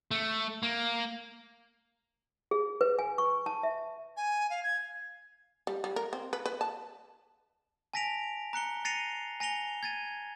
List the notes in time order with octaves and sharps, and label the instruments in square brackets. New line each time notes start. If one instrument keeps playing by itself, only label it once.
[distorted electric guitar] A3
A#3
[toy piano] G#4
B4
G#5
C#6
A5
E5
[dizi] G#5
F5
G#6
[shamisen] G3
G3
A#4
C4
B4
B4
A5
[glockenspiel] G#5 A5 A#6 B6 D7 F7
A#5 F#6 C#7 G7
A6 A#6 C7 C#7 D#7 F7
G#5 A#6 C#7 F7 G7
G#6 A6 D#7